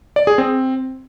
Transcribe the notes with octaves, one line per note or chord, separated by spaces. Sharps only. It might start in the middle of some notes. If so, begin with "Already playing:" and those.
D5
G#4
C4